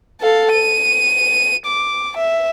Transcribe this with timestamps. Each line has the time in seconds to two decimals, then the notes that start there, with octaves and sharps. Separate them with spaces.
0.21 A4 F5
0.53 D#7
1.66 D6
2.17 E5